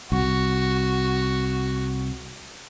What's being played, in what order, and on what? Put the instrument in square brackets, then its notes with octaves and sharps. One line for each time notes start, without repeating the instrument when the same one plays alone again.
[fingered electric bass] C2 [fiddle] F#4